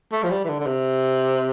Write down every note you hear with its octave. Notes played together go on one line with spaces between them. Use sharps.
A3
F3
G3
E3
D3
D3
C3